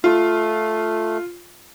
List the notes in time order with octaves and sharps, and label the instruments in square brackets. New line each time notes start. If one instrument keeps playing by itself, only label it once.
[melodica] A3 [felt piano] F4